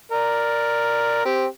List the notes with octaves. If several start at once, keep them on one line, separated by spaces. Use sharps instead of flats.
A#4 D5
C4 G4